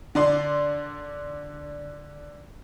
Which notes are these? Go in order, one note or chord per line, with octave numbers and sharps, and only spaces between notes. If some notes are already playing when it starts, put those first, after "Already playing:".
D3 D5 C6